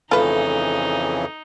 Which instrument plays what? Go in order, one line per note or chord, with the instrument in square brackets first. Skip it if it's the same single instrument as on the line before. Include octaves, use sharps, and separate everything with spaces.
[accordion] F2 C#3 E3 [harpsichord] A3 [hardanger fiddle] D#4 [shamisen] F4 B4